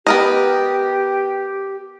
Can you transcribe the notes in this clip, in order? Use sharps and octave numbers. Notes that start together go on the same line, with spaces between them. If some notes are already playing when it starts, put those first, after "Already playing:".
B3 G4 A#4 D#5